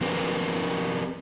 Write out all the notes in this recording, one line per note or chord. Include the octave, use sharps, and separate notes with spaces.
F3 C4 G4 A#4 B4